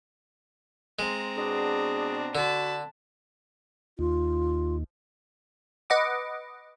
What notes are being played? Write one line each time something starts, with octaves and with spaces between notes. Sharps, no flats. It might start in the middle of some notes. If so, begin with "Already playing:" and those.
G#3 C4 A#5
B2 B3 D4 G#4
D3 F#4 A5 B5
D#2 F4
B4 D#5 F#5 D6